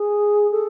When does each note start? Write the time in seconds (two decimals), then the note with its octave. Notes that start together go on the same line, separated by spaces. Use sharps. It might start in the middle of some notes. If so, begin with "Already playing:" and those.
Already playing: G#4
0.51 A4